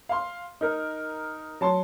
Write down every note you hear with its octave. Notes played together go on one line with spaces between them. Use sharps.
F5 C6
D#4 A#4
F#3 A5 C6